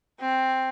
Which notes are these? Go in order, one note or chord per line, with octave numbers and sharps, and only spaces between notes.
C4